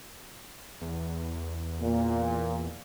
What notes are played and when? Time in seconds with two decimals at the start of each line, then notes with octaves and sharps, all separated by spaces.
0.81 E2
1.80 A#2